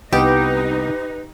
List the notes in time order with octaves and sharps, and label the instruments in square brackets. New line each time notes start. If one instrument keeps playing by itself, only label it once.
[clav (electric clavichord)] C2 B3 D#5 [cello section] D#4 [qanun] G4 [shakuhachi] B4